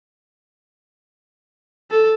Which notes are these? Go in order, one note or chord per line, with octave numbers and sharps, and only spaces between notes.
A4